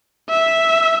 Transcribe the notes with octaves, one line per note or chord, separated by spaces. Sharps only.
E5